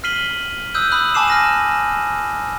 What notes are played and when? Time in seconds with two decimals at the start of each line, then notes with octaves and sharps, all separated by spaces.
0.04 F6 B6 C7 D#7 F#7 G7
0.74 D#6 E6 F#6 G6 D#7
0.91 B5 D#6 F#6 F#7
1.14 G#5 A5 D6 C7 E7
1.28 F6 A#6 D#7